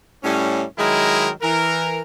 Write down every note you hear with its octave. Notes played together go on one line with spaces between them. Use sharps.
A2 G3 C#4
D#3 F#3 G#3 E4 A#4
E3 A#4